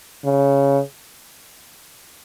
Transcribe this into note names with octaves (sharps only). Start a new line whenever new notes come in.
C#3